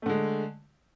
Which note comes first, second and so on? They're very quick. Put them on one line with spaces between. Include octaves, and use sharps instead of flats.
A3 D3 G#3